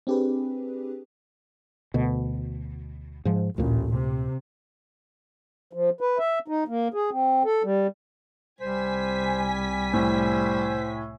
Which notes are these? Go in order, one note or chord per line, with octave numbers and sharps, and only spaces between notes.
C4 D4 G4 G#4 B4
D2 B2
G#2 F3
A1 D2 A#2
C3
F3
B4
E5
D#4
A#3
G#4
C4
A4
G3
C2 G3 C5 G#5 B6
A2 C5